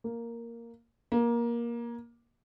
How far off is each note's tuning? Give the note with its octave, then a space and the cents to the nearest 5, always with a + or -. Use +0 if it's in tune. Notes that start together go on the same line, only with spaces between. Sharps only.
A#3 -5
A#3 +15